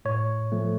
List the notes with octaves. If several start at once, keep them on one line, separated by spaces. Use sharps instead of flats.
A2 C#5
F3 A3